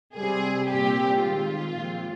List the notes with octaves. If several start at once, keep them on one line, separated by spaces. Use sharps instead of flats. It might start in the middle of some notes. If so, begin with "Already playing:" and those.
C3 G3 C4 G#4
A#2 G3 C4 G4
D#3 G#3 C4 F4
A#2 F3 G#3 C4